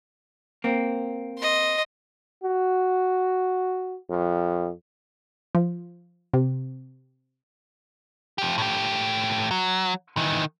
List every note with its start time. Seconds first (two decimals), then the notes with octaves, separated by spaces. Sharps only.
0.64 A#3 C4
1.39 D#5 C6
2.44 F#4
4.10 F2
5.55 F3
6.34 C3
8.38 F3 G4
8.58 A2 G4
9.51 F#3
10.17 D#3 E3